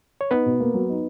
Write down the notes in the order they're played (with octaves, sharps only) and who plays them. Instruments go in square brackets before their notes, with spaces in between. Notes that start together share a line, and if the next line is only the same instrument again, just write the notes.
[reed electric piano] C#5
[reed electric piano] B3 B4 [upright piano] D#4
[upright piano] B2
A#3
F#3
D#4